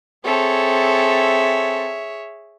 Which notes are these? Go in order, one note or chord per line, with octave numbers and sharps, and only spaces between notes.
C4 G#4 A4 C#5 E5